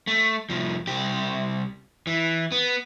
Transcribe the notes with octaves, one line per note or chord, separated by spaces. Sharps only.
A3
C2 F3
C2 G4
E3
B3